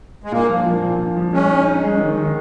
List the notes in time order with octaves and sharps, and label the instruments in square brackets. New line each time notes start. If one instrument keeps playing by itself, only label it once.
[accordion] G#3
[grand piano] A#2 [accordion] A#3
[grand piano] F3
F3
A#2
A#2
F3
[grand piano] G#3 [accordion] C#4
[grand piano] D#4
D#4
G#3
D#3
D#3